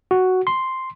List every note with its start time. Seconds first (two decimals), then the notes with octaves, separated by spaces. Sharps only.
0.11 F#4
0.47 C6